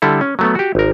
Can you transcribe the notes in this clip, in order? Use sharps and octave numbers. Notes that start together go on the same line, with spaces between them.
D3 G3 E4 A4
C#4
F#3 A3 B3
F#4 G4
G#1 A#4